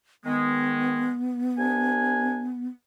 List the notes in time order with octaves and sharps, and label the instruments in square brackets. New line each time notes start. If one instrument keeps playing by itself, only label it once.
[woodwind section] D#3 G#3 [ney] B3
[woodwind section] C2 D4 G#5